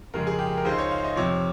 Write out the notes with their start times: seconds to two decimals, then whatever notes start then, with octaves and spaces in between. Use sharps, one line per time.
0.14 F2 C#3 G#3 A#4
0.27 G#4
0.39 G4
0.57 A#4
0.65 C#2 C#3 G#3 D#4 C5
0.78 C#5
0.91 F5
1.04 D#5
1.16 F2 C3 F3 C#5